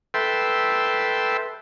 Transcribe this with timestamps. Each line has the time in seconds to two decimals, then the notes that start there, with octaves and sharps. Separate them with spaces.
0.14 A4 B4 E5 G5 C6